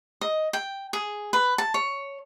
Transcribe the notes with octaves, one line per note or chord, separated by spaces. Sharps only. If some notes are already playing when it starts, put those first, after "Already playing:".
D#5
G5
G#4
B4
A5
C#5